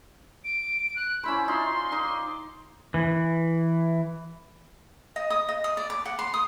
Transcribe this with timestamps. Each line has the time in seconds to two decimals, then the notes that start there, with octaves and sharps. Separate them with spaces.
0.44 D7
0.96 F#6
1.24 C#4 E4 C5 B5
1.48 D#4 F4 C6
1.92 D#4 D6
2.94 E3
5.16 D#5
5.30 D#6
5.49 D#5
5.64 D#6
5.77 D5
5.90 D6
6.05 F#5
6.19 C6
6.34 D#6